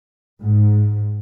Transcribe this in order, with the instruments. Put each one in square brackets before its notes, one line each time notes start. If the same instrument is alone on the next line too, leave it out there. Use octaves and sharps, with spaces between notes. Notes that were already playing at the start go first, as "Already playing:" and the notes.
[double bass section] G#2